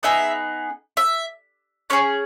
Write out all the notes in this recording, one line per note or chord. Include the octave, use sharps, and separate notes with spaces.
B3 D#4 G#4 E5
E5
C#4 G#4 C#5